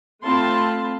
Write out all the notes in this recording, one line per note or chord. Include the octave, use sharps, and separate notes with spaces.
A3 C4 F4 A5 B5 C6